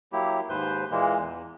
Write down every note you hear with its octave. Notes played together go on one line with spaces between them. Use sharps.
F#3 A#3 E4 G4
D#2 G#2 B4 C5 G6
A#2 E3 G#3 A#3
E2